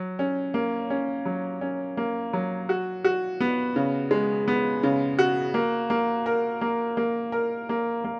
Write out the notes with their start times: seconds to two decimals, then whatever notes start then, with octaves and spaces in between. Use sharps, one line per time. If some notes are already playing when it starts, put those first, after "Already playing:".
Already playing: F#3
0.19 C#4
0.54 A#3
0.90 C#4
1.26 F#3
1.61 C#4
1.97 A#3
2.33 F#3
2.69 F#4
3.04 F#4
3.40 B3
3.76 C#3
4.11 G#3
4.48 B3
4.83 C#3
5.19 F#4
5.54 A#3
5.90 A#3
6.26 A#4
6.61 A#3
6.97 A#3
7.32 A#4
7.69 A#3
8.04 A#3